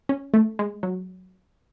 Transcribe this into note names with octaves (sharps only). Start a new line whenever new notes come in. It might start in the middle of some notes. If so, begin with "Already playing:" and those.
C#4
A3
G#3
F#3